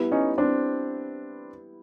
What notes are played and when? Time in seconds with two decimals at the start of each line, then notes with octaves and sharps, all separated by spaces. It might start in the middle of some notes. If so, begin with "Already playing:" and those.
Already playing: G3 B3 E4
0.12 C#4 D#4
0.38 C4 D4